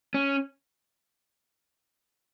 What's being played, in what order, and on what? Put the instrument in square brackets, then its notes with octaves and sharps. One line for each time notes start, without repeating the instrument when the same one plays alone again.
[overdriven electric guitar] C#4